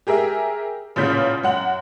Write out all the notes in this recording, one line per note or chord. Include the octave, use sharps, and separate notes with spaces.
G4 G#4 A#4 E5
A1 A#2 C#3 G6 B6
F#2 F#5 F#7